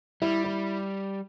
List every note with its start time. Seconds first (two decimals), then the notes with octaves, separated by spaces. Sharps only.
0.22 G3 E4
0.44 E4